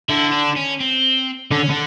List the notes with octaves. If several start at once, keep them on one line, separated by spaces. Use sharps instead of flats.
D3 E4
D4
C#4
C4
D3 C#4
D3